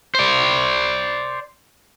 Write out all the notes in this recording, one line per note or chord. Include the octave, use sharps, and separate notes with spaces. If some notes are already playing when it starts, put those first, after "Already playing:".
C5 D5